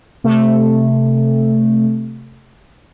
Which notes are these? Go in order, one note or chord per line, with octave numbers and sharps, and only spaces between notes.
C3 A3